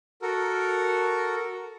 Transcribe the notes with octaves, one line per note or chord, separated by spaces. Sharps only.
F#4 A4 A#4